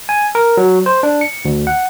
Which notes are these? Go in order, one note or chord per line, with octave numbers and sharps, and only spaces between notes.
G#5
A#4
F#3
C5
D4
C#7
D2
F#5